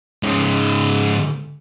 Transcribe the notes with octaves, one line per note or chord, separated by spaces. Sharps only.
G#2 C#3